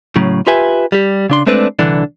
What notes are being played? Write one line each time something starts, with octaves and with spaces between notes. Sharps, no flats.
A2 C#3 F#3
F4 G4 B4 E5 G#5
G3 G4
C#3 D4 C6
G#3 A3 C4 D4 B4 D5
C2 D3 E3 D4